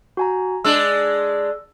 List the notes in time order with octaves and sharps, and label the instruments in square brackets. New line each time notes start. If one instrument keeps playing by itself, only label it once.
[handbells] F#4 G#5 A#5
[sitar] G#3 D4 [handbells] E6